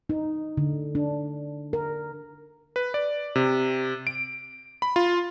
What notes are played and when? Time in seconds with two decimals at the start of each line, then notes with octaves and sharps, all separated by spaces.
0.09 D#4
0.57 D3
0.95 D4
1.73 A#4
2.76 B4
2.94 D5
3.36 C3
4.07 D7
4.82 B5
4.96 F4